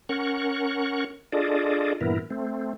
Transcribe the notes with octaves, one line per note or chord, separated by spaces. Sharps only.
C#4 A#4 F#5 C#6
D4 F4 G#4 A4 D5 D#5
G2 A#2 E3 B3 E4 A#4
A3 C4